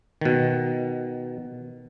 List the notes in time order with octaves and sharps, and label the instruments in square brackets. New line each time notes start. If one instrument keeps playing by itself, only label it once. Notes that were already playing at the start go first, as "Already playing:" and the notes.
[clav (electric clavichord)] B2 D#3